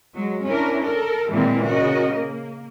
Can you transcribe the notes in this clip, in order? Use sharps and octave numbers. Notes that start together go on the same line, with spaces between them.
F#3 G#3
C#4 D4 E4 A#4
A4 A#4
A#2 D#3 E3 G#3 A#3 C4
C#3 F#4 A#4 D#5
A#3